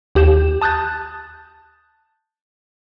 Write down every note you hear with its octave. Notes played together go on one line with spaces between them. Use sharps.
D#2 G4 G6 E7
A5 D#6 F#6 G6 A6